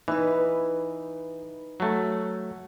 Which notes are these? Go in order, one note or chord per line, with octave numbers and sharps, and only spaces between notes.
E3 D#4 B4
F#3 A3